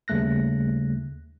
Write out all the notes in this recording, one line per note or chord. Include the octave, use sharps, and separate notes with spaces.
D#2 C#3 G3 A3 F#6 A#6